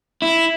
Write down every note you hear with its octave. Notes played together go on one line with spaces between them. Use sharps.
E4